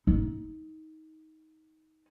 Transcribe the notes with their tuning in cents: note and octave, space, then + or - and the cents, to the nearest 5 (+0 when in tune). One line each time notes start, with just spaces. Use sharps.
D#4 +20